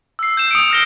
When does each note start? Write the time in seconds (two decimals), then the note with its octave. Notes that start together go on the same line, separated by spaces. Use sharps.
0.19 E6 C7
0.37 G6 E7
0.51 D#6 C#7 D7
0.71 F6 A#6 G7